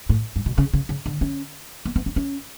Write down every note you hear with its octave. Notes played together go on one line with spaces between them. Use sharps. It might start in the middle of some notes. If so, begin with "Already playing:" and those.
A2
G2
B2
C#3
C#3
C#3
D3
C#4
B3
B3
C#4
C#4